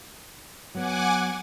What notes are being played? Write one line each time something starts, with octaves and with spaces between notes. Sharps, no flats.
F#3 B3 F#5 G#5 D6